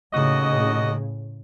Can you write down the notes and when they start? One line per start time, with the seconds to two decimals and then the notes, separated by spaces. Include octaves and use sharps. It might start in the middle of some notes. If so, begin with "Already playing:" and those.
0.13 D#2 A2 C#3 F#4 D#5